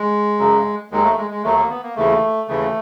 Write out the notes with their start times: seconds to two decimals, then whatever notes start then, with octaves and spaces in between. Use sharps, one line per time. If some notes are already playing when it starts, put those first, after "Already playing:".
Already playing: G#3
0.39 F#2 C#3 F#3
0.91 D#2 D#3 F#3 G#3
1.04 A3
1.17 G#3
1.31 G#3
1.44 D#2 D#3 F#3 A3
1.57 A#3
1.70 B3
1.83 A#3
1.96 D#2 C#3 E3 A3
2.48 D#2 C#3 E3 A3